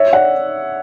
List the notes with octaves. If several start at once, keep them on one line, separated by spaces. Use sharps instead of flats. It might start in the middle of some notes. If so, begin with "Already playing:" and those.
Already playing: C#5 E5
D5 F#5